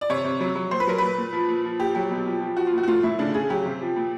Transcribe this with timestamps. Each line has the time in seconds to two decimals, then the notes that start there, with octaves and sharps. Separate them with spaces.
0.01 D5
0.10 C3 C#5
0.24 C3
0.40 F#3
0.55 F#3
0.71 A#2 C5
0.80 B4
0.87 F#3 A#4
0.98 A#2 B4
1.18 A#2
1.33 F3
1.48 A#2
1.65 F3
1.79 A#2 G4
1.95 F#3 G4
2.11 B2
2.26 F3
2.41 F3
2.57 F3 F#4
2.67 F4
2.73 A#2 F#4
2.83 F#4
2.88 A2 F4
3.03 A2 E4
3.19 C#3 D4
3.34 C#3 G#4
3.50 F#3 G4
3.66 C3
3.81 F3
3.96 A#2